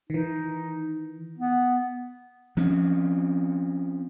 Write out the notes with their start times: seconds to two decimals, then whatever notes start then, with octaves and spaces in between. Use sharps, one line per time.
0.10 D#3 E3 D#4
1.38 B3
2.57 F3 C4 C#4